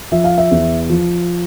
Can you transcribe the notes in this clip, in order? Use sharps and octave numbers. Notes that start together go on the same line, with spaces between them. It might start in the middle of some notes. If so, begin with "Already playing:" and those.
F3 E5
F5
E5
E2
F3